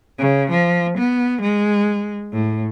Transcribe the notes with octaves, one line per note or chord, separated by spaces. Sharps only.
C#3
F3
B3
G#3
A2